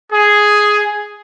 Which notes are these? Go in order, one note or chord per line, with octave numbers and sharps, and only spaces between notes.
G#4